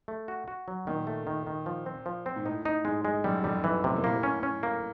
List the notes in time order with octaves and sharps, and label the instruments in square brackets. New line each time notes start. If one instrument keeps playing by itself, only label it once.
[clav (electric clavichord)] A3
F#4
F#4
F#3
[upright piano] A#2 [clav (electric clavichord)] D#3
[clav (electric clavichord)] A3
D#3
D#3
F3
C4
F3
C4
[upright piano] G#2
[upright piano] A2 [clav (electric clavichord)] D#4
[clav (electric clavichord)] D#4
[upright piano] G#2 [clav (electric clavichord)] G#3
[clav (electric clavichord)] G#3
[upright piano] F#2 [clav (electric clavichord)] G3
[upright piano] F2 [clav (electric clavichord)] G3
[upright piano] F2 [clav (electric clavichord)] E3
[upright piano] A2 [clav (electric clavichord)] C3
[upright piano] A#2
[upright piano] A2 [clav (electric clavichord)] A#3
[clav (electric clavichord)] C#4
C#4
A#3